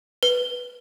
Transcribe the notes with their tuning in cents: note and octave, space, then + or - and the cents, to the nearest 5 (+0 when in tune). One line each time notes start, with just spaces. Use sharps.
B4 -5